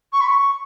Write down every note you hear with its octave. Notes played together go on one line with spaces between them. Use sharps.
C#6
B5
C#6